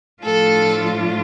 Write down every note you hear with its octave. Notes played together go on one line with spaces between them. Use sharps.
A2 F3 A3 D4 F4 A4